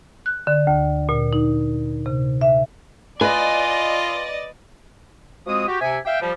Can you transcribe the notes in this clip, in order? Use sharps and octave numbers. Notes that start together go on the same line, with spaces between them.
F#6
D3
D2
A#2
D#4
C3
E5
F4 B4 D5 D#5 G#5 A6
F3 G#3 C4 F#4 D#6
F#4 G4
C3 E5 G#5
E5 F5 G5
F3 G3